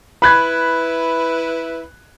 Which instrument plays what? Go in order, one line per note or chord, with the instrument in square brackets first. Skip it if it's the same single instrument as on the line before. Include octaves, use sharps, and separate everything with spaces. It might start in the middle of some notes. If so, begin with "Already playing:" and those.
[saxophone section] E4 B4 [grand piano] B5 F#6 G#6